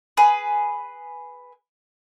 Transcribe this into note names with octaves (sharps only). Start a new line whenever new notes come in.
G#4 B4